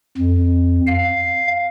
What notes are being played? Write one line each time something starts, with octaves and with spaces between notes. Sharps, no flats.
F2
F5